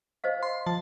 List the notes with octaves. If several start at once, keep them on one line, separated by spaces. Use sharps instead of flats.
C5 D#5 F5
C6
F3 A5